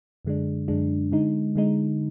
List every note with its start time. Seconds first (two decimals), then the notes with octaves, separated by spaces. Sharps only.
0.25 F#2 D3 G#3 D4
0.68 F#2 D3 G#3 D4
1.12 D3 G#3 D#4
1.56 D3 G#3 D#4